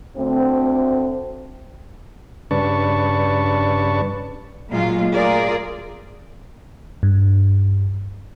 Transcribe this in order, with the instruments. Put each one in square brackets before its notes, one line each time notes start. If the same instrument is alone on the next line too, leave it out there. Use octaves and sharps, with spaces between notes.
[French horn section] D2 C4
[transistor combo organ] G2 C#3 D4 B4 A5 C#6
[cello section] A#2 F#3 G#3 F4
A3 F4 G#4 A#4 D5
[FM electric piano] G2